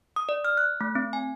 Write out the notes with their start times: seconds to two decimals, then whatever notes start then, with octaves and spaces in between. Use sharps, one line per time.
0.16 D#6
0.29 D5
0.45 F6
0.57 F#6
0.81 A3
0.95 C4
1.13 G#5